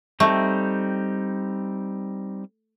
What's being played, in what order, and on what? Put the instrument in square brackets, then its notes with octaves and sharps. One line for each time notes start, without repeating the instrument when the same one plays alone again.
[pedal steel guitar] G3 C4 D#4 [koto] A3